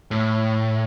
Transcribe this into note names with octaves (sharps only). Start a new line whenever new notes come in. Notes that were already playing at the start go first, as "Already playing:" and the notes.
A2